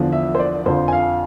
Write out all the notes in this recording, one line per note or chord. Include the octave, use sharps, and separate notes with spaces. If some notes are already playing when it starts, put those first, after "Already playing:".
Already playing: E2 D3 F3
E5
C5
D5
F2 D3 F3 C5
G#5
F5